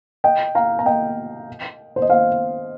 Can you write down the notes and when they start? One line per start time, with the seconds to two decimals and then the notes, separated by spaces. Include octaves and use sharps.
0.24 D#5 G5
0.55 F5 A#5
0.79 A#5
0.86 D#5 G5
1.96 C5
2.02 D#5
2.09 C5 F5